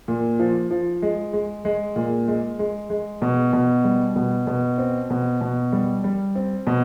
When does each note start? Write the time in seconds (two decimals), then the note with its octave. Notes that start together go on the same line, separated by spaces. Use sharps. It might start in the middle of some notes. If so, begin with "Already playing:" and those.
0.08 A#2
0.39 F3
0.71 F3
1.02 G#3
1.33 G#3
1.65 G#3
1.96 A#2
2.28 G#3
2.59 G#3
2.90 G#3
3.22 B2
3.53 B2
3.84 G3
4.16 B2
4.47 B2
4.78 C4
5.10 B2
5.41 B2
5.72 G3
6.04 G3
6.35 C4
6.67 B2